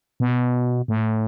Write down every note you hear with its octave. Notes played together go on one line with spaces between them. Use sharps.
B2
A2